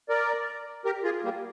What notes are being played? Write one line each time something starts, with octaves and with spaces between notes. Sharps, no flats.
A#4 D5
G4 A#4
F4 G#4
G3 A#3